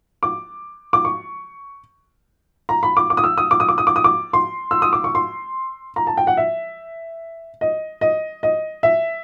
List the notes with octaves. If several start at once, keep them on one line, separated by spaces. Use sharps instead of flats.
D6
D6
C#6
A#5
B5
D6
D6
D#6
E6
D#6
D6
D#6
D6
D#6
D6
D#6
D6
C6
E6
D#6
D6
C#6
C6
A#5
A5
G5
F#5
E5
D#5
D#5
D#5
E5